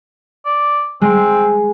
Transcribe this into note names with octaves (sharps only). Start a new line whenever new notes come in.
D5
G#3 C4